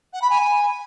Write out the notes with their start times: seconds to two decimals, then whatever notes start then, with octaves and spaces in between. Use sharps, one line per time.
0.13 F#5
0.21 B5
0.30 G#5